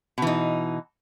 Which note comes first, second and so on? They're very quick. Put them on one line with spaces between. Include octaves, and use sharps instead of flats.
B2 E3 D#4